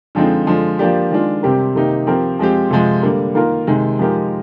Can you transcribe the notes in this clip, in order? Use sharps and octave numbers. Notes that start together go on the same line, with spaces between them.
D3 F3 G#3 C4 D#4
D3 F3 G#3
F3 A#3 D4 G4
D#3 G#3 D4 F4
C3 G3 C4 G4 A#4
C3 D#3 A#3 D#4 G4
F3 C4 G4 A#4
F3 G#3 C4 G4
C3 F3 G#3
D3 G3 A#3
D#3 A#3 F4 A#4
C3 D#3 G#3
F3 G#3 D#4 G4 A#4